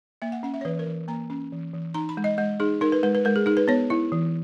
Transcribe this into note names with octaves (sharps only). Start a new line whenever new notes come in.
A#3 E5
F#5
C#4 F#5
E5
C#5
E3 B4
A#4
E3
A#3 A#5
C#4
E3
E3
D#4 A#5
B5
G#3
D#5
G#3 D#5
D#4 G#4
D#4 A#4
B4
G#3 B4
B4
G#3 A#4
G#4
D#4 G#4
B4
B3 C#5
E4
E3